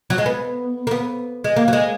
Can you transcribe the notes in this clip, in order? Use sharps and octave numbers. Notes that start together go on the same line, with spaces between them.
F#3
G#3
B3
A#3
B3
G#3
A#3
F#3
G#3